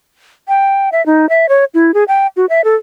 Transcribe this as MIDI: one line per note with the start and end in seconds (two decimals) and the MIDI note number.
0.48 0.89 79
0.92 1.04 76
1.06 1.29 63
1.29 1.49 76
1.49 1.65 73
1.74 1.94 64
1.94 2.04 68
2.08 2.27 79
2.36 2.46 66
2.50 2.61 76
2.64 2.75 69